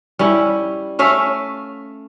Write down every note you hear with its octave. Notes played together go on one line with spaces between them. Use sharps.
G3 C#4 E4
A3 C#4 E5 F5